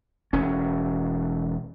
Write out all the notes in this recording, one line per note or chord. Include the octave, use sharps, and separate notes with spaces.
E1 C#4